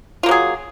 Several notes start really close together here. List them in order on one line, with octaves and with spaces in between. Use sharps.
F4 A#3 F#3 G#4